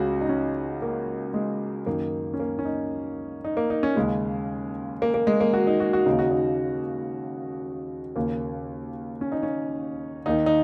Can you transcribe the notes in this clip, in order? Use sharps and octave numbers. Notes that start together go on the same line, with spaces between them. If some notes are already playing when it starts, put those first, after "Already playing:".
Already playing: C#2 C#3 F#4
D#4
C#4
A#3
G#3
F#2 D#3 A#3
C#4
A#3
C#4
D#4
D#4
A#3
D#4
C#4
D#2 C#3 G#3
A#3
A#3
G#3
A#3
F#4
D#4
F#4
F#4
D#2 C#3 D#4
F#4
D#4
D#2 C#3 A#3
C#4
D#4
C#4
D#2 D#3 D#4
D#4